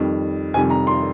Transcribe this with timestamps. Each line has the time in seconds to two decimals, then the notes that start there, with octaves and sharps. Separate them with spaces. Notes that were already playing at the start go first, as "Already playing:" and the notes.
Already playing: F2 D#3 G3
0.54 F2 C3 D#3 G3 G#5
0.70 A#5
0.87 C6